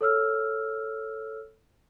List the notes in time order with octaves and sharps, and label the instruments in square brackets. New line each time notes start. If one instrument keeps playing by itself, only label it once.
[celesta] A4 C#5 E6 F6